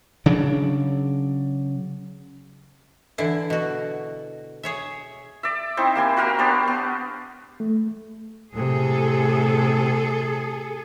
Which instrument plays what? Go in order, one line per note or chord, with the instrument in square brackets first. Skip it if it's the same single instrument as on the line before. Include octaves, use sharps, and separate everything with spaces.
[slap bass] C#3 F#3 D4
[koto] D3 E3 E4
B2 F#4
G#4 C#5 E5
[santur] D5 E5
C4 D#4 E4 C5
A#3 G4 G#5 C6
F#4 G4 A#4 F5
B3 D4 C5 D5
B3
[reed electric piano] A3
[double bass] A2 C3 [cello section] G#4 A4